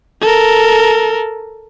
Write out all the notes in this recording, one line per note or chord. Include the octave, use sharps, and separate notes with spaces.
A4 A#4